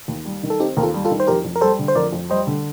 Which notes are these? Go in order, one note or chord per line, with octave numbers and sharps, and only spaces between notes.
D#2
G3
D#3
A4
C4 D#4 G4
D#2 A#4
F4 A4
G3
F4 A4
D#3
C5
F2 G4 A#4
F2
A#4
G3 A4 C5
D3
C5
F2 A#4 D5
F2
G3 C5 D#5
D3